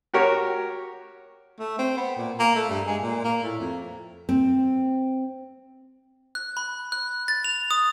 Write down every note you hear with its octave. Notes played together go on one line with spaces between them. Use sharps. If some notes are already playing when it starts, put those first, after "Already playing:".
F#4 G4 A#4 C#5
A3
C4
B3
A#2
A#3
A3
G2
G#3
A#2
A#3
A2
F2
C4
F#6
B5
F#6
A6
F7
D#6